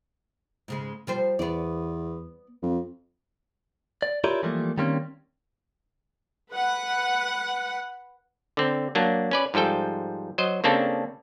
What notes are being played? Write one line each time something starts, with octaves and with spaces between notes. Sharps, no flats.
G#2 C#3 G#3
F3 G3 C5
E2 B3 D5
F2
D5
E4 F4 G4 A#4 C#5 D5
E3 F3 G3 A3 A#3
D#3 G3 A#3 C4 C#4
B4 F#5
D3 C4
F#3 A#3 D4
C#4 B4 D5
G#2 F3 G3 A4 G5
F#3 C5 D#5
C#3 A#3 C4 D4 A4